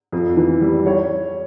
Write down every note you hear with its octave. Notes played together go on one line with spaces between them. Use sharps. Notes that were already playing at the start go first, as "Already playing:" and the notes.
F2
E3
G3
C#5